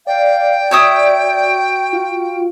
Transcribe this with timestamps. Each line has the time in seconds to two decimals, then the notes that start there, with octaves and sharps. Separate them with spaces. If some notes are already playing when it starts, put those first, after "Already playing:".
0.07 D5 F5 G5
0.71 F#4 C#5 E5 D#6
1.93 F4